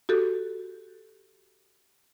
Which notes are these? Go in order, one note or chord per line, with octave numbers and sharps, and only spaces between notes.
F#4 G4 A4